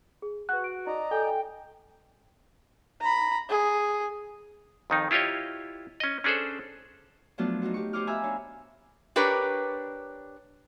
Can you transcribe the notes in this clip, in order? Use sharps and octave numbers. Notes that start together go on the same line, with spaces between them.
G#4
F#4 B4 F#6
D7
D#4 D5 D#5 A#5
A4 G5 G#5
A#5 B5
G#4
F2 D#3 D#4
E4 F4 G4 C#5 D#5
C#4 D#5
C#4 D4 G#4 A4 C5
F3 F#3 A3 B3 D4 F4
D#4 F4 F#4 C5
G4 C#6
G4 C5 C#5 D#5 D6 F6
E5 F5 G#5 A#5 B5 E6
D4 C#5
D4 G4 A#4 B4 C#5